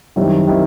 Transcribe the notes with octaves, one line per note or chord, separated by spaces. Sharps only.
F#2 D#3 G3 C4 E4
D#3 G3 C4 E4